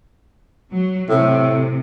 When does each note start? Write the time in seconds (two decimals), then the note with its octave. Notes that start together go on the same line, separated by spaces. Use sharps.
0.71 F#3
1.09 A2 C3